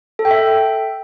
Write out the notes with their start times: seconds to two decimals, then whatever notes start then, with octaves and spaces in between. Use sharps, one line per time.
0.19 A4
0.25 G5
0.31 E5